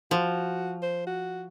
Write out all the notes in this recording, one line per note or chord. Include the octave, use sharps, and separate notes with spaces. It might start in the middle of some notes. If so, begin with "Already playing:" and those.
F3 F#4
C5
F#4